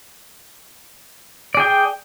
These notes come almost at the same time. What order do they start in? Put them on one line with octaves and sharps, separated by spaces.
D5 G#4 G5